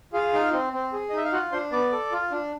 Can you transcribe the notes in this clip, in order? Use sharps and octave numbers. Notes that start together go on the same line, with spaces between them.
F4 G#4 F5
D#4
C4
C4
G#4
D#5
D#4 E5
F5
F4 F#4 F#5
D4 C5 C6
B3 D5 D6
A4
F4
D4